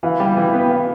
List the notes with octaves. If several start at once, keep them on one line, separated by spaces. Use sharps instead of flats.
E3 F5
G3
G5
E3
B3 G5
F5